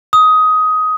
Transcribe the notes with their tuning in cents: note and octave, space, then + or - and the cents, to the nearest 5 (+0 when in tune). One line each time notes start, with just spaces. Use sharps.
D#6 +15